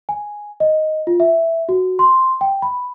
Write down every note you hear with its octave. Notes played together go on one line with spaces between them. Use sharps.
G#5
D#5
F4
E5
F#4
C6
G5
B5